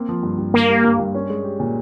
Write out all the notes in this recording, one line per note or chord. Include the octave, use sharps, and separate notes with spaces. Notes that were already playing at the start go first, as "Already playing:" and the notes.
Already playing: A#3 C4
F3
G2
G2
G2 A#3
G3
G2
G2
C#4
G#3
G4
A#2